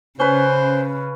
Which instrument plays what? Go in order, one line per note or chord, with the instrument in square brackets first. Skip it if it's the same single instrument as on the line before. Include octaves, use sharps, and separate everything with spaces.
[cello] C#3 [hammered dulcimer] C#4 B4 [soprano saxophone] C5